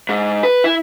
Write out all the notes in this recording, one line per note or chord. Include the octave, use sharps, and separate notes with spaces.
G#2
B4
E4